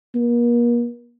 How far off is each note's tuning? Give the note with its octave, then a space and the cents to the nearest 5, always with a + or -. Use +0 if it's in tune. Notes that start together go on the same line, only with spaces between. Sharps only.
A#3 +40